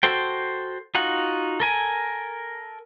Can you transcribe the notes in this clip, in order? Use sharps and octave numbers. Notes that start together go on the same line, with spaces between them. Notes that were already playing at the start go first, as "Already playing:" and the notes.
F#4 A4 C5 G5
D#4 F4 F#4 F#5
A4 A#4 G#5